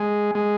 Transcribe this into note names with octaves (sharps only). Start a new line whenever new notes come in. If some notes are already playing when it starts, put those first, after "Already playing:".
Already playing: G#3
G#3